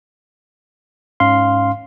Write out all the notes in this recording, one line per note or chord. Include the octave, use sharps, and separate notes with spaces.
G#2 C#4 F5 C6